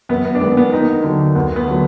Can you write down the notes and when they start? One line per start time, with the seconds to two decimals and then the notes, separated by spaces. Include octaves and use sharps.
0.09 F#2 B3
0.25 B3
0.35 D4
0.41 D#3 G#3 B3
0.52 D4
0.57 B3
0.72 D#2 D#4
1.04 D3 F#3
1.35 D2 B3
1.56 B3
1.67 D3 F#3